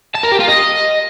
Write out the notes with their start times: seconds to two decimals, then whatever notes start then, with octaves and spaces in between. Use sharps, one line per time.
0.15 A5
0.23 A#4
0.32 G4
0.40 F4
0.48 D#5